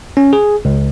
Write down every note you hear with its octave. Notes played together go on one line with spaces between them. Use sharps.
C#4
G#4
C#2